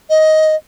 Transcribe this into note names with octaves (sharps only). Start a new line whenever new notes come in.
D#5